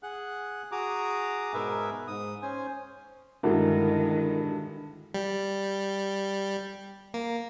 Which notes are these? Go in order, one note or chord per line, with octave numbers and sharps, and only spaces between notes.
G#4 F#5 F#6
F#4 G#4 A#5 D6 D#6
G#2 B2 G#4 A#4 B4 E5
G#2 D#6
C#4 C5 G#5
G2 D3 D#3 G#3 E4 F#4 A#4
G3
A#3